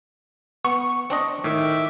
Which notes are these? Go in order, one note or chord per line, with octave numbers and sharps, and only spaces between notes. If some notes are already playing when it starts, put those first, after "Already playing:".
B3 C#6
C4 D4 D#5
A2 D#3 E5 D6